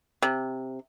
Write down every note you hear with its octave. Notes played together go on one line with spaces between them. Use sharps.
C3